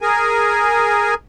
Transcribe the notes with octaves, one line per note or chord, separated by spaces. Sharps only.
G#4 A#4 G#5